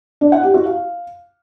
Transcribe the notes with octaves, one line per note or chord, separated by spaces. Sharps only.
D4
F#5
G4
F#4
F5